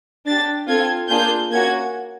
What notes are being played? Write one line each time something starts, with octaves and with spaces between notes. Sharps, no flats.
D4 G4 A6
C4 F4 A4 G#6
A#3 D4 F4 G#4 G6
A#3 C#4 F#4 G#6